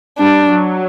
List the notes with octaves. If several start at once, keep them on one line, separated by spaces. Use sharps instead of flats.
G3 D4
F#3